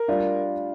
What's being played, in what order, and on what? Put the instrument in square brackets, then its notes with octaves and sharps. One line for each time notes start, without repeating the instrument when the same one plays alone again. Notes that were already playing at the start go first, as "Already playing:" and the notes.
Already playing: [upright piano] A#4
[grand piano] G3 D4 F4